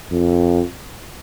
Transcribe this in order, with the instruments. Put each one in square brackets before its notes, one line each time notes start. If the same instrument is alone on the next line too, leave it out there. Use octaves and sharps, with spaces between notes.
[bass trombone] F2